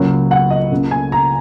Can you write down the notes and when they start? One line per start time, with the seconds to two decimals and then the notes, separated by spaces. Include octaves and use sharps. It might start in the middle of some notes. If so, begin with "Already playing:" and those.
Already playing: C#2 C#3 F#3 A#3
0.31 F#5
0.50 D#5
0.72 C#2 C#3 A#3
0.91 G#5
1.12 A#5